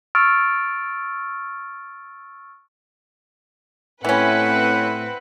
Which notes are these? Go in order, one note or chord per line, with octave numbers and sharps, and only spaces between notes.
C#6 E6 F6 A6 D7
A2 E3 C4 C#4 E4 B4 F#5